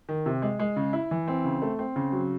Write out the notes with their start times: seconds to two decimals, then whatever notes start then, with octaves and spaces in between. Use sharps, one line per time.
0.09 D#3
0.26 C3
0.42 G#3
0.59 G#3
0.76 C#3
0.93 E4
1.11 E3
1.28 C4
1.45 C#3
1.62 A3
1.79 C4
1.96 C#3
2.12 F#3